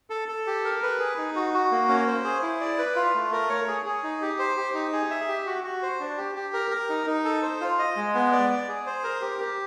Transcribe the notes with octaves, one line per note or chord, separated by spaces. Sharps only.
A4
A4
G4
A#4
B4
G#4
D#4
F#4
F#4
A#3
C#4
C5
G#4
E4
D5
B4
F4
A3
A#4
C#5
G#4
G#4
D#4
G4
C5
G4
D#4
G#4
E5
G4
F#4
F#4
C5
D4
G4
G4
A#4
A#4
D#4
D#4
A4
C5
F4
D#5
G#3
B3
D5
D5
G#4
C5
A#4
G4
G4